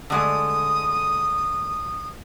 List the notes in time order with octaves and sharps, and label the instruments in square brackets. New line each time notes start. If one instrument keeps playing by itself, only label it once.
[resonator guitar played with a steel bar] D3 G#3 A3 [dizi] D#6